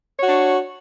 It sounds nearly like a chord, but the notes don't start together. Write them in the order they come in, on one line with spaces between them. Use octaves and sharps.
C#5 F#4 D4